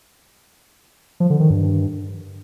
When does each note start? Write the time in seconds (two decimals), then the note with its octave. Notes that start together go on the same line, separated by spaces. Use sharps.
1.20 F3
1.30 D3
1.40 D#3
1.50 G2